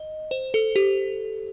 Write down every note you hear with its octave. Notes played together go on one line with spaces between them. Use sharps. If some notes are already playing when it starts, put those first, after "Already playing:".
Already playing: D#5
C5
A4
G4